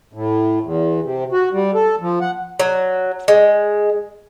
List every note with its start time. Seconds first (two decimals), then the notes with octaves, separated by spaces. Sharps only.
0.13 A2
0.63 E2
1.03 C3
1.32 F#4
1.53 G3
1.75 A4
2.01 F3
2.21 F#5
2.59 F#3
3.28 G#3